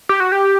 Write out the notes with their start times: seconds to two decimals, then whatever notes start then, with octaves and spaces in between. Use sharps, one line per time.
0.09 G4
0.20 F#4
0.32 G4